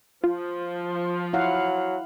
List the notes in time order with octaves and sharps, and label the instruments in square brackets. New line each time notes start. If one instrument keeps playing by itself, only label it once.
[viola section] F3 [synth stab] F4
[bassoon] F#3 [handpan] E4 F5 F#5